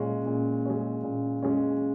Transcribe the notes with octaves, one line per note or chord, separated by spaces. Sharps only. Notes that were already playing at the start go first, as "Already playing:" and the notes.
Already playing: A#2 G#3 C#4
A#2
G#3 C#4
A#2
G#3 C#4